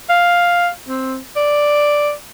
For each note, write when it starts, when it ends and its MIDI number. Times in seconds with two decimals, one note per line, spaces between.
0.10 0.69 77
0.88 1.18 60
1.36 2.12 74